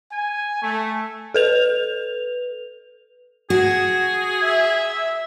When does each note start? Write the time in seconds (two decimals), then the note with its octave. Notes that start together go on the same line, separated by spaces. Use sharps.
0.12 G#5
0.62 A3
1.34 A4 B4 F7
3.50 F#4 G#4
4.43 E5